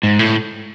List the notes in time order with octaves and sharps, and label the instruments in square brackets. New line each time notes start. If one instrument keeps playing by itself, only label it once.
[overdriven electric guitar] G#2
A2